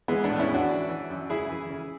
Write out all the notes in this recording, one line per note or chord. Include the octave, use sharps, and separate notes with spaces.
E3 G#3 B3
B3 D4
A2
C#4 E4
E3
D4 F#4
E3
E3
F#2
C#3 E4 G#4
E3
C#3